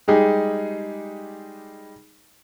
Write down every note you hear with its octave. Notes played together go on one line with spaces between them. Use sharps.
G3 G#3 D#4 G4 G#4